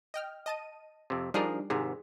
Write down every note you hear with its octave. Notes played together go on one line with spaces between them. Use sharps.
D#5 G5 F6
D#5 A5 D#7
F2 C3
F3 G3 D4 D#4 G#4 A#4
G#1 G#2 C3 G#4